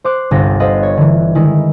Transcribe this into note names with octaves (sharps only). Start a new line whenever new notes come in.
C5 C6 D6 F#6
G1 C2 B3 A4 A#6
A4 B4 C5 D#5 F5
C#5
D3 E3
D#3 G#3 E4